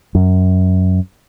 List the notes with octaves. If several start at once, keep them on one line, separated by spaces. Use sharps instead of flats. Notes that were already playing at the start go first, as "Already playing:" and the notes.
F#2